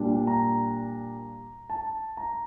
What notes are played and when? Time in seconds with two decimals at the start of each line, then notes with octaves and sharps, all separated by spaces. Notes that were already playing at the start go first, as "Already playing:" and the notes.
Already playing: A#2 G3 D4
0.27 A#5
1.70 A5
2.17 A#5